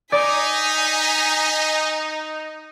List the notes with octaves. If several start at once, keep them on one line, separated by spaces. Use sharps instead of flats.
D#4 D5 G#5 B6